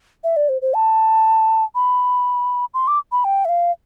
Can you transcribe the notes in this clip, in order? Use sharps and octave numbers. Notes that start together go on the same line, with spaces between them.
E5
D5
C5
C5
A5
B5
C6
D6
B5
G5
E5
F5